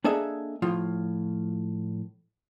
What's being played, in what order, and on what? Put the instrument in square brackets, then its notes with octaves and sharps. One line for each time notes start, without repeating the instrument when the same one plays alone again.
[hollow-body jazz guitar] A#3 D4 G#4 A4 D#5 E5
A2 F3 F4